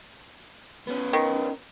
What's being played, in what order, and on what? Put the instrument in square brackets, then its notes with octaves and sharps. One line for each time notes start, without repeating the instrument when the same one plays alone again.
[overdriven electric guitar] B3 C#4
[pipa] D#3